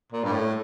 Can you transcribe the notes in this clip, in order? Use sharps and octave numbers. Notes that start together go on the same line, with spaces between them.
A#2
G2
A2